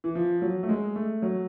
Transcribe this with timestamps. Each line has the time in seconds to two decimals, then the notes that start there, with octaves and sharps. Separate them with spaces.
0.04 E3
0.15 F3
0.42 F#3
0.63 A3
0.69 G#3
0.96 A3
1.22 F#3